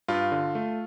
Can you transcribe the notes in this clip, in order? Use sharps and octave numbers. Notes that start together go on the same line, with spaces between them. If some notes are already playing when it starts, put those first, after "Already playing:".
G2 F4
D3
A3